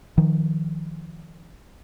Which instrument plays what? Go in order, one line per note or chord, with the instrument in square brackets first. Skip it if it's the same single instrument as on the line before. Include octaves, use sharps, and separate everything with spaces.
[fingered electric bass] D#3 F3